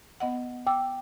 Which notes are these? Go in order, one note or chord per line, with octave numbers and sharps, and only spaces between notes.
B3 D#5 F#5
G5 D6 E6